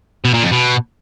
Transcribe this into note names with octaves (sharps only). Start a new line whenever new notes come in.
B2
A#2
F2
B2